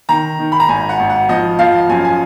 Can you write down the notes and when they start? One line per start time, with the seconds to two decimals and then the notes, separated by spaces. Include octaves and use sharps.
0.09 D#3 A#5
0.39 D#3
0.52 B5
0.60 A#5
0.68 G#1 G#5
0.89 F#5
0.99 G#1
1.09 F#5
1.29 F3 D#5
1.59 F3 F5
1.89 F#2 G#5
2.05 G#5